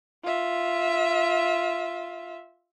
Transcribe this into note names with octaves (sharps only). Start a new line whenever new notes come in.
F4 E5